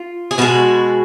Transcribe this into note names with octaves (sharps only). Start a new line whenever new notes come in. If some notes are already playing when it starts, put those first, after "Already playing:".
Already playing: F4
G#4
B2 G#3 F#4